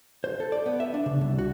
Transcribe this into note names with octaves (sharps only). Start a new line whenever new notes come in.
C5
A4
D5
B3
E5
D4
C#3
C2
F#4